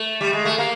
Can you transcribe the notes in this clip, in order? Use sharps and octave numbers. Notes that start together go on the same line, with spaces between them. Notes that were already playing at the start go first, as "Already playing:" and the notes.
Already playing: A3
G3
G#3
A3
A#3